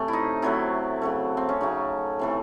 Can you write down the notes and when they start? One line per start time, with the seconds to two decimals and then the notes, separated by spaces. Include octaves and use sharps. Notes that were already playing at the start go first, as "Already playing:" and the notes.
Already playing: C3 A3 C#4
0.08 E4
0.13 D#4
0.42 C3 F#3 A3 E4
1.02 C#3 F#3 A3
1.37 C4
1.49 C#4
1.61 C#3 F#3 A3 D#4
2.19 C3 E3 A3